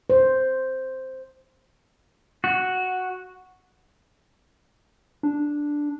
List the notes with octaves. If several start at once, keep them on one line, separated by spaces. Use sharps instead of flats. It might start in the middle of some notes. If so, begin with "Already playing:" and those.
C5
F#4
D4